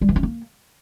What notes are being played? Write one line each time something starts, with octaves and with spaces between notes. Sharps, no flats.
G3
E3
C#4
A#3